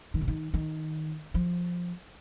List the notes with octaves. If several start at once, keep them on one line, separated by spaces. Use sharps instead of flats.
D#3
C3
D#3
D#3
F3